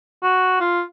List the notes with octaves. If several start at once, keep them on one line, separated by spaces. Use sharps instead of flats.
F#4
F4